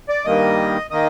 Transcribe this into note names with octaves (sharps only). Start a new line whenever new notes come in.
D5
G2 D#3 A#3 D#5
D#3 A#3 D#5